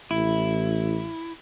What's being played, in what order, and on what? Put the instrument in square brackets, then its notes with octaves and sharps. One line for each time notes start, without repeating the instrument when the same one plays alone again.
[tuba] A1 [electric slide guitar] E4